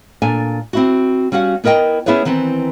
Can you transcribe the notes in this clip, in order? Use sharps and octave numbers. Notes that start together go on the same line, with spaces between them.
A#2 D4 A4 G#5
C4 E4 F#4
G3 C#4 F#4 F5 F#5
B3 E4 A#4 D#5 G5
B3 C#4 E4 G#4 B4 C#5
D#3 E3 B3 C4